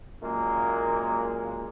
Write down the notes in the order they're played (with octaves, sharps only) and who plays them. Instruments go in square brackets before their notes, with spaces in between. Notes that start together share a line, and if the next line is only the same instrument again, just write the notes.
[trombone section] F#2 A#2 G#3 A#3